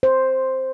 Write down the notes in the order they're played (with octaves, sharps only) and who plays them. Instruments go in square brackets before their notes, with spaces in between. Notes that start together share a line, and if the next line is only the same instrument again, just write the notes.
[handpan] C5